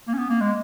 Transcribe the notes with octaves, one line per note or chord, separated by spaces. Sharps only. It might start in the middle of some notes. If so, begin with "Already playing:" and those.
A#3
C#4
B3
A#3
G#3